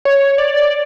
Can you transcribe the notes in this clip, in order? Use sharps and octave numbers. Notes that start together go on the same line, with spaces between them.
C#5
D5